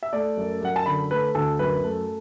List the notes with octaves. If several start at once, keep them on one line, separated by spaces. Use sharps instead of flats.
E5
A3 D5
F#2
F#2 F#5
A5
D3 B5
A3 B4
D2 A4
F#2 B4
A3